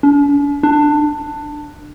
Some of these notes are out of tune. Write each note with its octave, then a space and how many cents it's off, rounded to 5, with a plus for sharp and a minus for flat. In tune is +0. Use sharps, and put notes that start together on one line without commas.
D4 -45
D4 +15